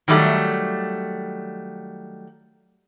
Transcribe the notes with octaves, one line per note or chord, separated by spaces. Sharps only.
D#3 F#3 G3 A3